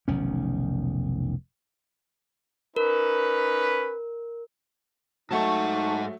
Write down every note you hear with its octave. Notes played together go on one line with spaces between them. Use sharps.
F1 B1 D#3 C#4
C#4 D#4 A#4 B4
G#2 F#3 A3 D#4 F#5 A5 C#6